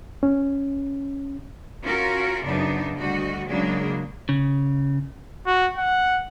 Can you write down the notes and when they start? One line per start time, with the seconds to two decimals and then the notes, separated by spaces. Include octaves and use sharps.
0.23 C#4
1.82 C#4 F4 F#4 A#4
2.44 F#2 C#3 B3 D4 D#4
2.96 D2 G3 F#4 D#5
3.47 C#3 F#3 G#3 A#3 D4
4.29 C#3
5.47 F#4
5.76 F#5